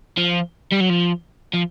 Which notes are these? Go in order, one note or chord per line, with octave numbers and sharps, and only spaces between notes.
F3
G3
F#3
F3
F3